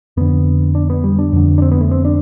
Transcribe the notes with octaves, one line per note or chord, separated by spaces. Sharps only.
F2 D3 B3
D4
B3
G3
D4
F2 D3
D4
C4
B3
A3
C4
D4